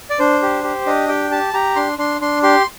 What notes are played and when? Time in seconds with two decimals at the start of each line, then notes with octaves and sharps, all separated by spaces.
0.10 D5
0.19 D4 C5
0.42 G4
0.64 G4
0.86 D4 D#5
1.08 G4 G5
1.31 G4 A5
1.54 G4 A#5
1.76 D4 C6
1.98 D4 C6
2.21 D4 C6
2.43 G4 C6